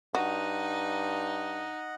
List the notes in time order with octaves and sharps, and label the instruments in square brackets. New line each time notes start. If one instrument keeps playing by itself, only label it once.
[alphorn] G2 [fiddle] D#4 [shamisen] F#4 [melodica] D#5 F#5